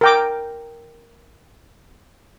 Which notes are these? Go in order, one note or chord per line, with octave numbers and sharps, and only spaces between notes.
A#4 G5 D6